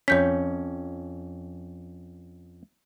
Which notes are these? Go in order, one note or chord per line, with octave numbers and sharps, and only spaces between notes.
F2 C#4 C#5 G6 B6